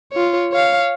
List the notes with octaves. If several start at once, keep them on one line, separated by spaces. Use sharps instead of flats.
F4 C#5
C#5 F5